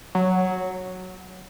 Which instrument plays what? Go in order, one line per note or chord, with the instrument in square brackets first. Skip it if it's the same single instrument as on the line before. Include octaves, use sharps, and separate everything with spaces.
[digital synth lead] F#3